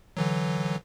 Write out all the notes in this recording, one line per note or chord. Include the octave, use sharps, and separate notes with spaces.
D3 E3 F#3